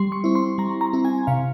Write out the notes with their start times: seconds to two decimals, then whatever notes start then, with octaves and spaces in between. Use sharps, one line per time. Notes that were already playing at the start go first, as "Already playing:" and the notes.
Already playing: G3 C6
0.12 C#6
0.24 C4 E4
0.35 C6
0.58 G3 A#5
0.81 A#5
0.93 C4 E4
1.05 G#5
1.27 C3 F5